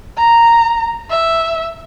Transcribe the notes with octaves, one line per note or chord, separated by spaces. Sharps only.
A#5
E5